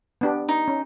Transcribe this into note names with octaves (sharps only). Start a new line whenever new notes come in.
B3 D4 G4
D#4
C#4